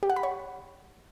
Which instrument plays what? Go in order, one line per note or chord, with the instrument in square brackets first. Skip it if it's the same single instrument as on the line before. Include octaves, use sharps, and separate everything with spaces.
[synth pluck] G4
F#5
B5
C#5